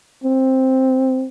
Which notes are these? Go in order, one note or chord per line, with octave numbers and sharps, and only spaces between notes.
C4